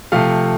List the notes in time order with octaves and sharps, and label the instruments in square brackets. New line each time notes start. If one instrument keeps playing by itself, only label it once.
[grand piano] C3 F3 A3 F5